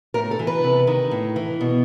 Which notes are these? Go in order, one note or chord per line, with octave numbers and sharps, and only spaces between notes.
A2 A#4
A4
E3
B4
C3
D#3
A2
E3
B2